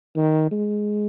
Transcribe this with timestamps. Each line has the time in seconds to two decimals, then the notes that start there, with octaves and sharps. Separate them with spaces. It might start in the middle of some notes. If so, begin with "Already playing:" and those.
0.17 D#3
0.52 G#3